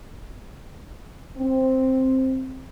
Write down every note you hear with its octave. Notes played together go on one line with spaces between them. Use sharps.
C4